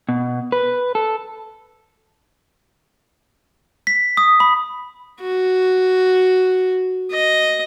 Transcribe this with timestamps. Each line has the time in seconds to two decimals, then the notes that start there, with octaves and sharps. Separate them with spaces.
0.09 B2
0.52 B4
0.95 A4
3.87 B6
4.17 D#6
4.40 B5
5.20 F#4
7.11 D#5